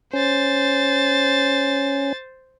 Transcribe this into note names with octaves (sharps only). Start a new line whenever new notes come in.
C#4 C5 A6